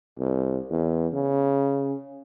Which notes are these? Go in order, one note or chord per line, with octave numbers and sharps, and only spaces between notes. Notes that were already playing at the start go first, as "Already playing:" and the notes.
C2
E2
C#3